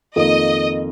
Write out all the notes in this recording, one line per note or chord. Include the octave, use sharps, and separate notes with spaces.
F2 D#3 A#3 D#5